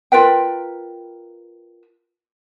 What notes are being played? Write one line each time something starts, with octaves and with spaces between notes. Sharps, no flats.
F4 A#4 B4 G5